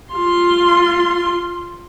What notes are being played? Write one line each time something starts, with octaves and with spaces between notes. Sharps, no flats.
F4 C6